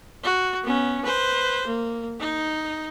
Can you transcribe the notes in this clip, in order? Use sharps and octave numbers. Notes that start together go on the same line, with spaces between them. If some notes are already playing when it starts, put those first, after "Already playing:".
F#4
B3 C#4
B4 C5
A#3
D#4